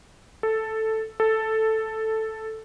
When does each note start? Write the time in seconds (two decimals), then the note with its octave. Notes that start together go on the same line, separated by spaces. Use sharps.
0.43 A4
1.20 A4